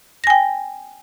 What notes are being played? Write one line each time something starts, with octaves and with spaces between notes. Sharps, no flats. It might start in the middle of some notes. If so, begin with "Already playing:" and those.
G5 G#5 A#6